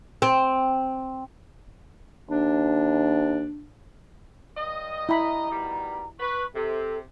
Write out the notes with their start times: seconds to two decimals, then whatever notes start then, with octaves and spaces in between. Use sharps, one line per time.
0.22 C4
2.31 D#2 D4
4.57 G2 D#5
5.09 E4 A#5 B5
5.52 B2 D#3 G3
6.20 B4 C#6
6.54 C3 A4